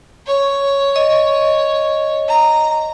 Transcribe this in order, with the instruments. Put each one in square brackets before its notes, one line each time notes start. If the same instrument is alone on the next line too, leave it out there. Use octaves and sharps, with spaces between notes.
[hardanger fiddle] C#5
[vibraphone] D#5
[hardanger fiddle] A#5